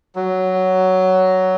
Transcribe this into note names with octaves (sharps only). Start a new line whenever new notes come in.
F#3